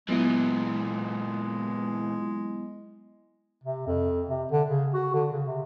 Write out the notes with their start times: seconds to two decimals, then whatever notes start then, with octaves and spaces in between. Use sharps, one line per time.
0.08 A#2 E3 F#3 G#3 B3 E4
3.64 C3
3.87 F2
4.28 C3
4.52 D3
4.69 C#3
4.94 F#4
5.14 D3
5.33 C#3
5.46 C3